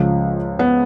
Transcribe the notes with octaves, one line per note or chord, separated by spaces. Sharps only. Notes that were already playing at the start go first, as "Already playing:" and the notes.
Already playing: C#2 C#3 F3
B3